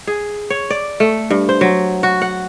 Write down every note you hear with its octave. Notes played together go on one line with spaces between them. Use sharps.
G#4
C#5
D5
A3
G2
C5
F#3
F#4
F#5